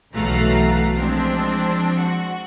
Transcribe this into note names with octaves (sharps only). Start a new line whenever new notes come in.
B1 E3 A3 F#4 F5 A#5
F3 G#3 C4 D4
F#4